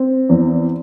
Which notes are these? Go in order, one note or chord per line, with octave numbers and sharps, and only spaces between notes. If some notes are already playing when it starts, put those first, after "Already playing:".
Already playing: C4
E2